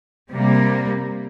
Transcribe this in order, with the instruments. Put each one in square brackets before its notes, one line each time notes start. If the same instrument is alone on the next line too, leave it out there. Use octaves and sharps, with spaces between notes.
[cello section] C3 G3 A#3